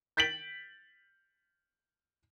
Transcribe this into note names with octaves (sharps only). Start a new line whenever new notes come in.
G6 A6 B6 D7 F#7